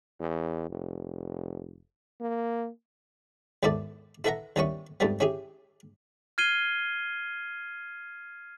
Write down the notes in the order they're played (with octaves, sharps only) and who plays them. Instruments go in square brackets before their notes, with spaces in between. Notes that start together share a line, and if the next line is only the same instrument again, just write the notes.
[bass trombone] E2
F1
A#3
[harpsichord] D#2 G#2 B3 E4 A4 D5
E4 A4 B4 E5 F#5 A#5
D#2 G3 B3 C#4 E4 C#6
F2 G#2 G3 A3 B3
C#4 E4 G4 G#4
[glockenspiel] F6 G#6 C7 D#7 G7